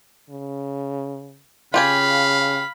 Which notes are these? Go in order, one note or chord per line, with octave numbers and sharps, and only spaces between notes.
C#3
C#3 F4 G4 F5 G#5 B5